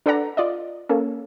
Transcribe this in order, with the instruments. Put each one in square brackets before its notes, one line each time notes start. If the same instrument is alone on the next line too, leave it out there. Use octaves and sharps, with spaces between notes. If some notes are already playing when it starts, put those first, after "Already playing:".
[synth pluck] D4 A4 B4 D5 F#5 A#5
F4 D5 D#5
A#3 C#4 A4